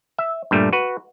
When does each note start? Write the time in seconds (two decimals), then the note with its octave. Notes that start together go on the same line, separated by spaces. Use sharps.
0.18 E5
0.51 G2 A#2 G3 A3
0.73 F#4 B4